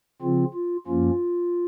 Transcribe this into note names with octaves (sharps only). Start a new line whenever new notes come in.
C#3 F3 C4 F4
F4
F#2 F3 A#3 C#4 F4